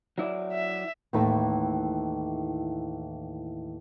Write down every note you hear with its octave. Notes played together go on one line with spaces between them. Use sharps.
F#3 E4 D5
E5
D#2 A2 E3 A3 D#4 A4